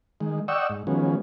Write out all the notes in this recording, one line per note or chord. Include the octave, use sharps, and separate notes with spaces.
D#3 G#3
D5 D#5 F#5 G5 C#6 E6
G#2
D#3 F3 F#3 G#3 B3 C#4